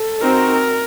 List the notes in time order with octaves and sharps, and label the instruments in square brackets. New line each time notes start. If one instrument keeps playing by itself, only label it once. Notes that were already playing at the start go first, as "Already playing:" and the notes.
Already playing: [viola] A4
[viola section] C4 D#4 F#4 [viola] A#4